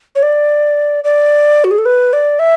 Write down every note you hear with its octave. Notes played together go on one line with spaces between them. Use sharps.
C#5
D5
D5
F#4
G#4
A4
B4
D5
E5